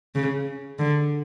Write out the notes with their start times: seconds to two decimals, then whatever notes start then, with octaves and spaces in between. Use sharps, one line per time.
0.15 C#3
0.79 D3